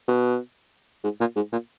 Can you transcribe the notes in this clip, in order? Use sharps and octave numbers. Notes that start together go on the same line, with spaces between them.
B2
G#2
A#2
G#2
A#2